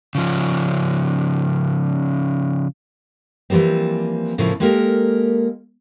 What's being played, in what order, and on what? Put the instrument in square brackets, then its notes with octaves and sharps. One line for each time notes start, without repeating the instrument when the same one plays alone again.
[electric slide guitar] C#3 F3 C#4
[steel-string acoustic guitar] E3 F3 G3 A#3 C4
A2 C#3 F3 A#3 C4 E4
G#3 A#3 G4 A4 A#4